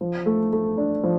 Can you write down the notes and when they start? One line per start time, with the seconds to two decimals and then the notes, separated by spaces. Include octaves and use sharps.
0.01 F3
0.26 A3
0.53 A3
0.78 D4
1.03 F3